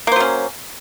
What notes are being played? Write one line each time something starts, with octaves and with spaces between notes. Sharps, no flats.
F#3 A#3 C#4 C5